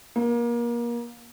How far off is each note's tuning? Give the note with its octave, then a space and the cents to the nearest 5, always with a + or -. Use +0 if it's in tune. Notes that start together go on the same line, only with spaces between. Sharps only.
A#3 +30